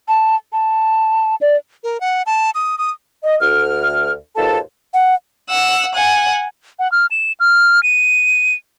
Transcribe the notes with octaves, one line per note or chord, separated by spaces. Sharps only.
A5
A5
D5
A#4
F#5
A5
D#6
D#6
D#5
D2 F6
D#2 G#2 B2 F4 A4 A5
F#5
F#5 E6
F#5 G#5
F#5
F6
E7
F6
D#7